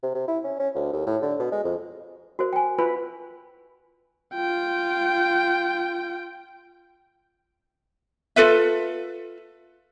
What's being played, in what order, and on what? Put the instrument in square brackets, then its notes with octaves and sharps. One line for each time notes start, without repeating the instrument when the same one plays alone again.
[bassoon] C3
C3
E4
C#4
C#4
D2
D#2
A2
D3
B2
G#3
F2
[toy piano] F#4 A#4 C5
G5 G#5
[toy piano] F4 [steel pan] B4
[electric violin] F4 G5
[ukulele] F4 A4 B4 E5